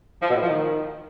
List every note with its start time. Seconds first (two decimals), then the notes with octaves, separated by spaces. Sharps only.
0.22 F3
0.29 B2
0.36 A2
0.42 F3
0.49 D#3